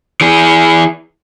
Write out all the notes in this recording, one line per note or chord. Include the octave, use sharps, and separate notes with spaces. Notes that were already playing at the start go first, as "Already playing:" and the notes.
E3 G#4